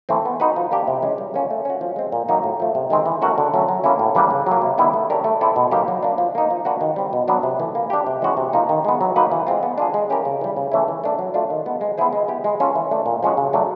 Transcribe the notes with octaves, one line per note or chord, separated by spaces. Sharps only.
E3 A3 C4
B3
D#4 F#4 B4
F3
A#3 D4 G4
C3
E3 G#3 C#4
G3
A#3 C#4 F4
A3
C#4 F#4
F3
G#3 C4
A#2
F#3 A#3 D#4
A2
F3 A3
C3
D#3 G#3 C4
E3
A3 C#4 F#4 A#4
D3
F#3 A3 C#4
F#3
A#3 C#4 E4
A2
E3 G3 A#3 D4
C#3
F#3 A#3
C3
D#3 G3 B3 E4
A3
D4 G4 A#4 C#5
A3
C4 E4 A4 D5
B2
F#3 A#3 D#4 G4
F#3
A#3 D4
F3
A#3 D#4
F3
A#3 D4 F#4 B4
D#3
G3 C4
B2
F#3 B3 D4
C3
E3 A3
A#3
D4 G4
C3
E3 G#3 C#4 F#4
C3
F3 A#3 D#4
D#3
G#3 B3
F#3
A#3 D#4 F#4 B4
E3
G#3 C4 F4
B3
D4 F4 G#4
G#3
C#4 E4 G4 A#4
C#3
E3 G3
C#3
E3 A3 C#4 E4
E3
A3 D4
F#3
A3 D4 F4
D#3
G#3 B3
G#3
B3 E4 G#4 C5
G#3
B3 E4 G4
G#3
C#4 F4 A4
E3
A3 D4
A#2
F3 G#3 C#4 F#4
C#3
F#3 A3 D4